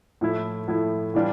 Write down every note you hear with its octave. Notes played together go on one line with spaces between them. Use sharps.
A2 F3 A3 E4
A2 F3 A3 E4
A2 E3 G3 D4 F4